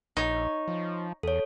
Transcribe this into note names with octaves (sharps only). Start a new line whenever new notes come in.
A#1 D#4 C#5
F3
E2 A4 C#5